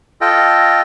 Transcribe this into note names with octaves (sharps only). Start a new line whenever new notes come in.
F4 A4 D#5 G5